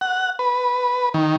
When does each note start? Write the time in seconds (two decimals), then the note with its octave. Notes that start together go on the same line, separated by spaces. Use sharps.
0.01 F#5
0.39 B4
1.14 D#3